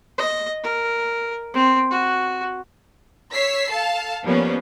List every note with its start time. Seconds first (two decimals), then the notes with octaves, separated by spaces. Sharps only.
0.18 D#5
0.63 A#4
1.54 C4
1.91 F#4
3.33 C#5 E6 B6 C7
3.70 A4 F5 A5
4.25 F3 G3 A#3 B3 C#4